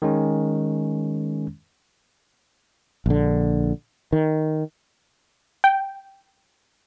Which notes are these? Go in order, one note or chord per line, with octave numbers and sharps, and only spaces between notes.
D#3 G#3 C#4
A#1 D3
D#3
G5